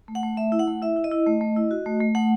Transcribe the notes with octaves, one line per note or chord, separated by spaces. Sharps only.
A3
F#5
A3
A3 E5
E4
F#5
A3
E4 E5
E4
D#5
E4
A3
A3
E4
F#4
A3
A3
A3 F#5